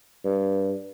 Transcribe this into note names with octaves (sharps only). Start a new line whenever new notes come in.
G2